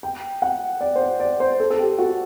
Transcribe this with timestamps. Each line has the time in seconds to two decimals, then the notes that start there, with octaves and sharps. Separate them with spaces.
0.03 G5
0.42 F#5
0.81 D5
0.96 C5
1.01 D5
1.20 D5
1.40 C5
1.60 A4
1.70 A4
1.79 G4
1.98 F#4